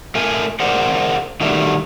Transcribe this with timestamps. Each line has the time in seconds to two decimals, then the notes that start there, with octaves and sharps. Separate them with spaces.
0.15 A3 A#4 G#5
0.60 G#4 A#4 C5 D5 F#5
1.41 D#3 F#3 G3 A3 D4